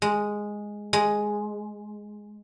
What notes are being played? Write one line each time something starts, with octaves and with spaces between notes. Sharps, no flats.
G#3
G#3